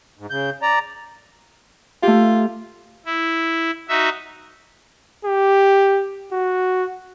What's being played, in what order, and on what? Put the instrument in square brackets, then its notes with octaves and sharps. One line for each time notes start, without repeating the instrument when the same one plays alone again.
[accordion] G#2
C#3 G6
D5 A#5
[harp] A3 G4 [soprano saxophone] F4
[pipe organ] E4
D#4 F#4 E5
[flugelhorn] G4
F#4